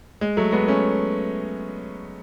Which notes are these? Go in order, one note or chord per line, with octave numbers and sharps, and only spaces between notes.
G#3
F#3 A3
G#3 B3
A3 C#4